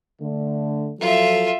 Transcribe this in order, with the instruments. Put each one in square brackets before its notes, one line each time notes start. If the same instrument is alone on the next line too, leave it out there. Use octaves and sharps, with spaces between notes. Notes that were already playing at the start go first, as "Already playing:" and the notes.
[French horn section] D3 A3
[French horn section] F3 F#3 A4 [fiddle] F4 E5